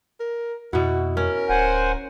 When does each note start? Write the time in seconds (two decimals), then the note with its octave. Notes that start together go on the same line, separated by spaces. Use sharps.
0.20 A#4
0.73 F2 B2 E4 F#4
1.17 C#4 A#4
1.49 D1 C5 F#5 G#5